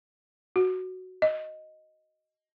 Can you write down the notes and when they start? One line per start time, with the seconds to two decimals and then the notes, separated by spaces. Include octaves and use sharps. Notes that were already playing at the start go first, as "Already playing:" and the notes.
0.56 F#4
1.22 D#5